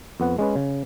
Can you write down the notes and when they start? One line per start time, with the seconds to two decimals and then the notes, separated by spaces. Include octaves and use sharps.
0.20 F2 B3 F#5
0.39 G#3 C#4 B4
0.56 C#3